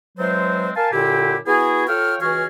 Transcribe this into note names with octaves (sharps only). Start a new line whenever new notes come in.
E3 F#3 G#3 C4 C5
A#4 F5 G#5 A5
F#2 A#2 D3 E4 G4
B3 E4 F#4 G#4
F4 A4 C#5 G5 F6
C#2 E3 F#4 G#4 C#5 F6